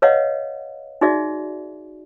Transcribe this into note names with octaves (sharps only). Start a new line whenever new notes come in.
B4 C#5 D#5 F5 F#5
D#4 F#4 G#4 D5 E5